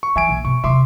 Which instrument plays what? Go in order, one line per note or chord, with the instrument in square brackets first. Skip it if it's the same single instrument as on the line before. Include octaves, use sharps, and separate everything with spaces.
[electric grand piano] C#6
[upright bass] E3 [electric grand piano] E5 G#5 D7
[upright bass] A#1
[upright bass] B2 [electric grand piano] C#6
[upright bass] E2 C3 [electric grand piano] E5 C6 D6